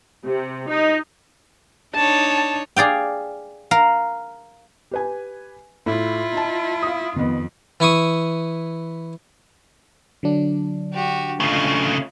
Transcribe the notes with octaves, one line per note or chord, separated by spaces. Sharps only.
C3
D#4
D4 D#4 C#5 A5
G#4 D5 F5 G5
A#4 F5
G4 B4 G#5
A2 E4 F4
D#4 A5
F5 D#6
F2 D#3 B3
E3 E4 C#6 D#6
D3 F#3 D4
F#4 G4
C#3 A3 F4 D#5